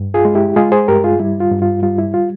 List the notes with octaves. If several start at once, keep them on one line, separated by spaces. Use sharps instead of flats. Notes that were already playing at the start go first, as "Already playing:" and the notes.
Already playing: G2
F4 G#4
G#3
E4 G4
G#3 F4 G#4
G#4 C5
G2 G4 A#4
F4 G#4
G3 E4
F4
G2
F4
G3 F4
E4
F4